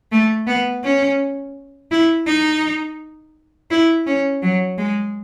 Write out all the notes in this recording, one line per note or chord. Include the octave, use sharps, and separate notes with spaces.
A3
B3
C#4
E4
D#4
E4
C#4
F#3
G#3